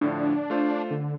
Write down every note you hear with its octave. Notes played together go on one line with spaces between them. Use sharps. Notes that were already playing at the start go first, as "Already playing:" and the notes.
A2 D3 F3 D4
A3 F4 C5
D3